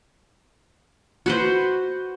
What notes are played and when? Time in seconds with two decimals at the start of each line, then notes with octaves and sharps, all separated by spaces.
1.26 F#4 B4 C5